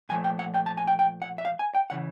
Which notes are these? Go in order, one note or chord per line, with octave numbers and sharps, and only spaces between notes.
A#2 F3 A3 G#5
G5
F#5
G5
A5
G#5
G5
G5
F#5
E5
F5
G#5
G5
C#3 E3 F#5